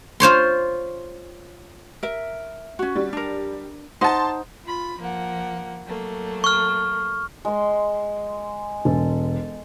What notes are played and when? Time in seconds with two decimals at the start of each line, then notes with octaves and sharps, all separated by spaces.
0.20 F4 C5 C#5 C6
2.03 A#4 E5
2.79 C#4 F#4
2.96 G3
3.13 D4 A#4
4.01 D#4 C5 F#5 A5 C6
4.64 F4 B5
4.99 F3 A#3 F#5
5.86 F#3 A3 A#3
6.44 C#6 F6
7.45 G#3 C6
8.85 E1 A4